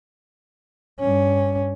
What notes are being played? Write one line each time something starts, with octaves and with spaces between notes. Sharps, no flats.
G2 C#4